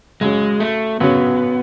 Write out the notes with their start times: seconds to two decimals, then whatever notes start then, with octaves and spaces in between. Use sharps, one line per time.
0.21 F#2 C#3 F#3 G#3 C#4
0.60 A3
1.00 F#2 C#3 F#3 B3 C#4